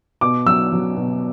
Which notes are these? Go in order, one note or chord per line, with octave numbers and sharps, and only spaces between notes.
B2 D6
F#3 E6
F#3
B2